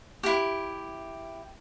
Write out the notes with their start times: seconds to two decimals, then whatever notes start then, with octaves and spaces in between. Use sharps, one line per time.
0.23 E4 G4